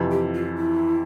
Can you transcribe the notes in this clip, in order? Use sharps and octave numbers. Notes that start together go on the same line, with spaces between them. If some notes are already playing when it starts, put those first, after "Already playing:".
Already playing: F2 C3 E3
G4
F4
E4